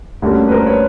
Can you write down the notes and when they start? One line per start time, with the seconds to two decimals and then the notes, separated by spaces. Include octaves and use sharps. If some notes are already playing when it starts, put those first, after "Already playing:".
0.22 D2 D3 G3 A#3 C#4
0.48 B4
0.52 A#4 C5
0.67 B4 C#5